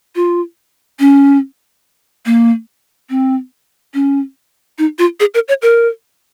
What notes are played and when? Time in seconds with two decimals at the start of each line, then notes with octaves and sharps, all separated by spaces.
0.16 F4
1.00 C#4
2.26 A#3
3.10 C4
3.94 C#4
4.78 D#4
4.99 F4
5.20 G#4
5.34 A#4
5.48 C#5
5.62 A#4